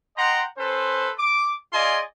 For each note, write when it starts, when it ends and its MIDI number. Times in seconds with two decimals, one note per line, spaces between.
0.17 0.41 75
0.17 0.41 78
0.17 0.41 79
0.17 0.41 82
0.17 0.41 84
0.58 1.10 61
0.58 1.10 69
0.58 1.10 71
0.58 1.10 72
1.18 1.52 86
1.73 1.99 65
1.73 1.99 68
1.73 1.99 74
1.73 1.99 75
1.73 1.99 80
1.73 1.99 84